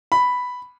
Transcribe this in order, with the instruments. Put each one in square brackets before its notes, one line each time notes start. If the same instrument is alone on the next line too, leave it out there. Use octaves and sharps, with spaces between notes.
[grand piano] B5